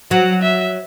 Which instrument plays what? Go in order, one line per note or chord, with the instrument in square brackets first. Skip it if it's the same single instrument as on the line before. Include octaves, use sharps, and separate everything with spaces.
[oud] F#3 [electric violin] F#5
[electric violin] E5